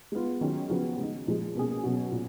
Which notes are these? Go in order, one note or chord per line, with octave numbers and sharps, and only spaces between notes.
G#3 B3 F4
D#3 F#3 C#4 F4 G#4
C#3 F3 B3 F#4
C#3 G#3 D#4
A#2 F3 G#3
B2 A#3 C#4 G#4
B2 F#3 C#4 F#4
A#2